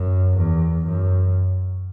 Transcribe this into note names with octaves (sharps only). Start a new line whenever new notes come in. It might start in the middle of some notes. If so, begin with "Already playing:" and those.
Already playing: F#2
E2
F#2